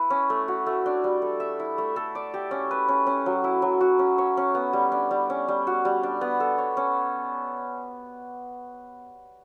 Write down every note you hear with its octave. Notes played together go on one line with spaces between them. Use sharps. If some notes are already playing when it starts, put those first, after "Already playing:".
Already playing: E4 B4
C#4
A3
F#4
A3
D4
G3
A4
E5
E4
A3
A4
D5
G4
C#4
B4
C#4
C#4
F#3
E4
F#3
F#4
C#4
C#5
C#4
B3
G3
D4
G3
C#4
G3
F#4
G3
D4
B3
A4
C#5
C#4